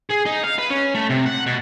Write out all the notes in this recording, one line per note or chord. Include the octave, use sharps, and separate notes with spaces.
G#4
D#4
F5
B4
C#4
A3
C3
F#5
B2